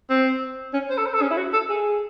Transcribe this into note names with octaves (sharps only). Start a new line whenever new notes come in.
C4
C#4
C5
A4
C5
A4
C#4
E4
F#4
A4
G#4